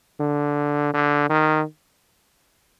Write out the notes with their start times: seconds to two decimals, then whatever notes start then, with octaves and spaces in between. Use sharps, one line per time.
0.20 D3
0.93 D3
1.29 D#3